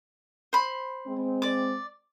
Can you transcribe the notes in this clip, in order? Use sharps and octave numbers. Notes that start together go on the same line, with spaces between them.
C5 B5
G#3 C4
D5 D6